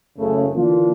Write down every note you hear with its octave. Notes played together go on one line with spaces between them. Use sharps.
F#1 C#3 A3
D3 E3 A#3 D4 F4